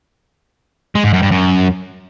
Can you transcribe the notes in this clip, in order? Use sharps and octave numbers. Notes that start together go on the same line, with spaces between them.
G#3
G#2
F#2
G2
F#2